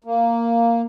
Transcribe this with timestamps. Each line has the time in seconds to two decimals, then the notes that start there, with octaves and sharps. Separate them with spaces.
0.04 A#3